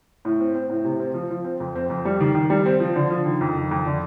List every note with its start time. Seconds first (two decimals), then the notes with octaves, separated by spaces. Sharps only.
0.25 A2
0.40 C4
0.55 C4
0.70 A2
0.84 C3
1.00 C4
1.14 F3
1.30 F3
1.44 C4
1.60 F2
1.75 C4
1.90 F2
2.05 G3
2.21 D#3
2.35 D#3
2.50 G3
2.66 C4
2.80 F3
2.96 D3
3.10 F3
3.26 D#3
3.41 F2
3.56 D#3
3.71 F2
3.86 D3